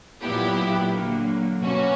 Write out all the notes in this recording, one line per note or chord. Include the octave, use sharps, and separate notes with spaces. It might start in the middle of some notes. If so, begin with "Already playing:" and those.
A#2 F#3 B3 E4 G4
D3 F#3 A#3
B2 A#3 C#4 F#4